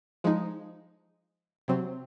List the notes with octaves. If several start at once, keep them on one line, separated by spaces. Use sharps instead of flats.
F3 G#3 D#4
C3 F#3 C4